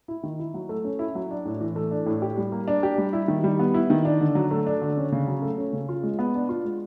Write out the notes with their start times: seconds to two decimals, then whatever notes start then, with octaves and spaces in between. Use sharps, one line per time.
0.08 E4
0.23 D#3
0.39 E4
0.54 F#3
0.69 A3
0.84 C#4
0.99 E4
1.15 F#3
1.31 D4
1.45 A2
1.61 E3
1.76 A3
1.91 D4
2.06 A2
2.22 G4
2.38 G3
2.52 A#3
2.68 D4
2.83 G4
2.98 G3
3.13 E4
3.28 D#3
3.44 G3
3.59 B3
3.74 E4
3.90 D#3
4.05 D4
4.21 D3
4.35 F#3
4.51 A3
4.67 D4
4.82 D3
4.97 C#4
5.12 C#3
5.27 F#3
5.42 A3
5.58 C#4
5.73 C#3
5.89 F4
6.03 G#3
6.19 B3
6.35 D4
6.49 F4
6.65 G#3